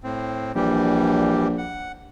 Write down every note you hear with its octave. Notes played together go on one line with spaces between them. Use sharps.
A2 C4
A#1 E3 G3 G4
F#5